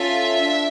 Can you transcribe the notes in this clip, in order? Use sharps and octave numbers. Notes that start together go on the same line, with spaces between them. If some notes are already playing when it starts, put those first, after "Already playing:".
Already playing: C#4 F4 A4 E5
D4